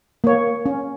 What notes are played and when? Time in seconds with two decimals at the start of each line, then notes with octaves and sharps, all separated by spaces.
0.24 A#3 C#5
0.66 C#4